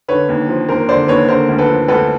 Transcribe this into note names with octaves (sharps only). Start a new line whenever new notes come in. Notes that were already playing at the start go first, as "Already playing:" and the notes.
D3 B4 C#5
D#2
F3
D#2 A#4 C5
D3 C5 D5
D#2 B4 C#5
D3 A#4 C5
D2
A4 B4
F3
D2 A4 B4